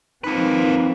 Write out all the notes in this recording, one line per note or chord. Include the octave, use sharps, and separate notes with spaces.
F3 A#3 C4 D#4 B4